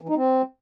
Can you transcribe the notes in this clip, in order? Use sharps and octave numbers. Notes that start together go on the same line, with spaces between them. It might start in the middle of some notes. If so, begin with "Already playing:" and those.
E3
D#4
C4